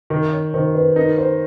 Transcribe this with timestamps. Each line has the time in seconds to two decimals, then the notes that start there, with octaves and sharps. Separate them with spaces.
0.10 D#3
0.32 C#5
0.54 D#3 C5
0.75 B4
0.96 D#4 A#4
1.18 C5